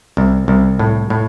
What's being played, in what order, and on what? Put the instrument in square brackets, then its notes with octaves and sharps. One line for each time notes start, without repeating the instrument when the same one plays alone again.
[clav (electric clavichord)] C2
C2
A2
A2